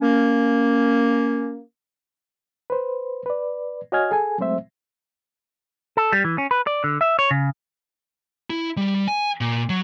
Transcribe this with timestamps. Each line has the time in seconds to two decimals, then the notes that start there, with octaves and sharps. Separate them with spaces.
0.02 A#3 C#4
2.70 B4 C5
3.26 B4 D5
3.92 F#4 C#5 D#5 G#5 F6 G#6
4.11 G#4 A4 G#5
4.38 F#3 G#3 A3 C4 C5 E5
5.97 A4
6.12 G3
6.24 E3
6.38 C#4
6.51 B4
6.67 D5
6.84 D3
7.01 E5
7.19 C#5
7.31 C#3
8.50 E4
8.77 G3
9.08 G#5
9.41 A#2
9.70 F#3